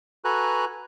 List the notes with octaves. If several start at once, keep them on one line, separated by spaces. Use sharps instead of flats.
F#4 A4 B4 G#5 A#5 F#6